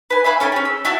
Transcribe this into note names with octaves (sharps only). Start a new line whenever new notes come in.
B4 G#5
E5 F5 G#5 B5
C#4 A4 G5 G#5
C#4 G#4
E6
E4 F#4 E5 A5